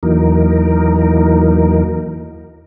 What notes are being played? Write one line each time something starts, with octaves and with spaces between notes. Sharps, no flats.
E2 E3 F#3 A#3 D#4 A#4